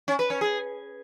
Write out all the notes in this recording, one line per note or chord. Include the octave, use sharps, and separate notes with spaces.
C#4
B4
C#4
G#4